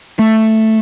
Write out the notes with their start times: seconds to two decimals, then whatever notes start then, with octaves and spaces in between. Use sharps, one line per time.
0.19 A3